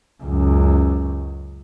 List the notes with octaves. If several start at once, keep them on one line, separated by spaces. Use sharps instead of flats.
C#2 F#2